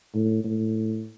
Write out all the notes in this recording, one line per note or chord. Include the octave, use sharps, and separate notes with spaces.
A2
A2